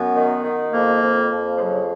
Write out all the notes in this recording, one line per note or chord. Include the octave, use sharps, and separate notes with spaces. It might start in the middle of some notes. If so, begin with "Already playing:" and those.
Already playing: F#2 B3
D#3
D#3
F2 A#3
F2
F2
F3
C#3 F#3